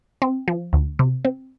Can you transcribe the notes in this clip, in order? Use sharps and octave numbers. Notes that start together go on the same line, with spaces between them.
C4
F3
D2
C3
C4